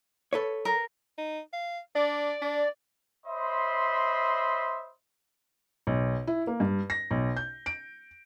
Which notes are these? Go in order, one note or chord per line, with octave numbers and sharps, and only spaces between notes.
A4 B4 C#5
A#4
D#4
F5
D4 D5
D4
C5 C#5 D#5 E5 B5 C6
B1
E4
A#3
G2
A#6
B1
G6
D7